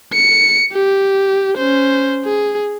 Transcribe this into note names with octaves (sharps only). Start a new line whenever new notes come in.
C#7
G4
C#4 C5
G#4